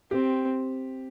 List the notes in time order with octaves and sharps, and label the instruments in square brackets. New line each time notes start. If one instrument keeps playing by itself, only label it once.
[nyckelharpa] C4 [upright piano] G4